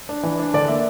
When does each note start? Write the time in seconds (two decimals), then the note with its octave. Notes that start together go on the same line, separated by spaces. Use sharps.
0.09 D4
0.23 E3
0.39 D4
0.54 D3 D5
0.68 A#3 E5